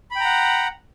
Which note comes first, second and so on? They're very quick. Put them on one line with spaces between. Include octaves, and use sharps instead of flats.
B5 G5 A#5 F#5